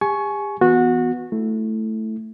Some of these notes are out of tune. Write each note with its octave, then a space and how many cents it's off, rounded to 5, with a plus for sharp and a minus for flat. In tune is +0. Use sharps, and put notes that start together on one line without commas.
G4 +40 G#5 +30 C#6 +0
E3 +0 B3 +0 F#4 -20
A3 +0 E4 +0